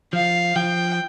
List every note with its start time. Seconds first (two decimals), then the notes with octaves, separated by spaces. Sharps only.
0.13 F3 F5
0.56 F3 G5